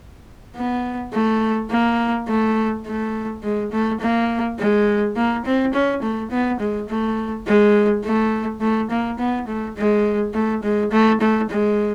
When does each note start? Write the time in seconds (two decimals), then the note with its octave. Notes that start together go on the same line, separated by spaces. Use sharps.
0.56 B3
1.13 A3
1.70 A#3
2.28 A3
2.86 A3
3.43 G#3
3.72 A3
4.00 A#3
4.59 G#3
5.16 A#3
5.45 C4
5.74 C#4
6.02 A3
6.31 B3
6.59 G#3
6.89 A3
7.47 G#3
8.04 A3
8.61 A3
8.90 A#3
9.19 B3
9.47 A3
9.76 G#3
10.34 A3
10.63 G#3
10.91 A3
11.21 A3
11.49 G#3